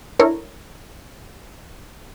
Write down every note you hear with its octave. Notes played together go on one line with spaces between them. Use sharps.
D4 E4 A4 A#4 C#5